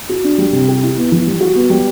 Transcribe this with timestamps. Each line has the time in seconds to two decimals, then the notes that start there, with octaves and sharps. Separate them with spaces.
0.09 F#4
0.24 D4
0.38 G3
0.52 C3
0.68 G4
0.83 E4
0.98 B3
1.12 E3
1.27 G3
1.41 F#4
1.55 B3
1.70 G3